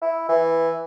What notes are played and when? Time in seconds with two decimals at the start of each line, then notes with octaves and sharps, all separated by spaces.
0.02 E4
0.29 E3